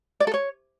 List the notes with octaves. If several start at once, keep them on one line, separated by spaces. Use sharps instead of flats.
D5
A4
C#5